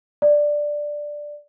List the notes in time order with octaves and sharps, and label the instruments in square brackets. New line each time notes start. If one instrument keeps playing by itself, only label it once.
[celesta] D5